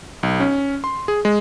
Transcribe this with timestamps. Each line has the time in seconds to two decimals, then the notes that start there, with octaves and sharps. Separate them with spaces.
0.23 B1
0.40 C#4
0.84 C6
1.08 G#4
1.25 G#3